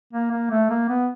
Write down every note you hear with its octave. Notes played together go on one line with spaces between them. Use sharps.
A#3
A#3
A3
A#3
B3